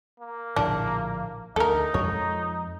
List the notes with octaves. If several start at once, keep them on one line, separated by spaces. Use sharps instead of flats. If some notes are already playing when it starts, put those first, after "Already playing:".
A#3
A#1 A2 D3 D4
D2 D#4 A4 A#4
F2 G#3 C#5